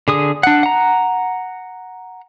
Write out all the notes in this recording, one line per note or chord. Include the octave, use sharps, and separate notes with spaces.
D3 G#4 D#6
D4 F#5
F#5 A#5